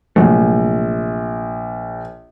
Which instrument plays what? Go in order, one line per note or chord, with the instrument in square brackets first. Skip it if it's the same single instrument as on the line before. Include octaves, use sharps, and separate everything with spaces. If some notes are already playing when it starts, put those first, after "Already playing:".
[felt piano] A#1 [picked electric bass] C3 F#3 A3